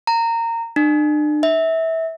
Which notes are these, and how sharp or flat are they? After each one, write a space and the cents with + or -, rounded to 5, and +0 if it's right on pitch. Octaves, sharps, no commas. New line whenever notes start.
A#5 -20
D4 +40
E5 -20